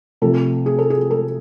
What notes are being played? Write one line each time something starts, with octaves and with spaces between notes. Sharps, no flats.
C3 F3 A3 A4
G#4
A4
G#4
A4